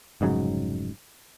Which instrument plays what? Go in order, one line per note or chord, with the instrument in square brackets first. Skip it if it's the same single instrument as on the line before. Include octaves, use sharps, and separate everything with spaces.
[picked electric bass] F1 G#2 C#3 F#3